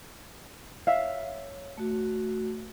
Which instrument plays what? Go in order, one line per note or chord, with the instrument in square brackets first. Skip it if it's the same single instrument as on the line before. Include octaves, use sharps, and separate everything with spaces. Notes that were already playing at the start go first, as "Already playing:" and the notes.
[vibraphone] C#5 [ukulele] E5 F5
[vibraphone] A3 F#4